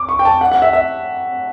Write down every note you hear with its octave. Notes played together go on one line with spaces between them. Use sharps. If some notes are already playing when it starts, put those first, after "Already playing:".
Already playing: D6
C#6
G5
A5
F#5
F#5
E5
E5